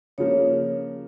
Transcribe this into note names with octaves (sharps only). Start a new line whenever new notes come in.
C#3 F3 A#3 C#5